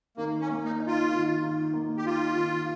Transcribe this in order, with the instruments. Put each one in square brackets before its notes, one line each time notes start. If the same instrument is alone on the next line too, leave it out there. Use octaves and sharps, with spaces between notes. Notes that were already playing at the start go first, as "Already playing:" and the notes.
[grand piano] D#3 [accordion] A#3
[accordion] C#4
[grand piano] A#3
[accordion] D#4
[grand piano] D#4
[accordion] F4
[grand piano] D#3
D#3
A#3
[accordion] G4
[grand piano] D#4 [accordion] F4
[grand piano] D#3